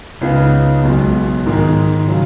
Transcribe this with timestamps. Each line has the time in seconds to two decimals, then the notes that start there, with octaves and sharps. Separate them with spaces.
0.21 C#2 C#3 B3 D#4
0.83 B1 B2 G#3
1.46 G#2 D#3 G#3
2.08 C#3 F#3